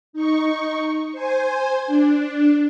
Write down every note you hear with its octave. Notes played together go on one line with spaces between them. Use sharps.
D#4 C#6
C5 G#5
D4